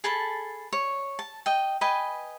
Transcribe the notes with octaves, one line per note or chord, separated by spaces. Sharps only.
G#4 A4 A5 B5
C#5
A5
D#5 G5
B4 D#5 G5 G#5